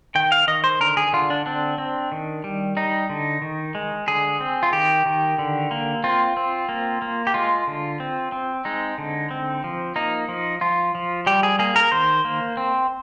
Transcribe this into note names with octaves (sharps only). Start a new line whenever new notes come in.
D#3 G5
F5
D#3 D#5
C5
D3 A#4
G#4
D3 F4
D4
C4 D4
C4
D#3
G3
G3 D#4
D3
D#3
G#3
D3 G#4
C4
F4
D#3 G4
D#3
D3
A#3
C4 F4
C4
A#3
A#3
G4
G#3 F4
D3
C4
C4
G#3 D#4
D3
C4
F3
A#3 D#4
F3
F3 F4
F3
G3 G4
G#4
A#3 G#4
A#4
D#3 C5
A#3
C4